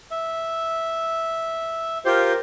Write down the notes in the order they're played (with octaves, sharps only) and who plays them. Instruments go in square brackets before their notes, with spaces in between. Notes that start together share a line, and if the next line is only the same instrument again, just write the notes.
[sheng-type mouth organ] E5
[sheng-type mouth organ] F4 G4 [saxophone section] A#4 C5